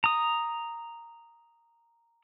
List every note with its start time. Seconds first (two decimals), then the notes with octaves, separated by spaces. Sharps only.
0.04 A#5 D#6